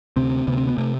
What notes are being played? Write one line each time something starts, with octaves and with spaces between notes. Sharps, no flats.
D2 C3 C4
D2 C3 B3
C4
B3
C3 A3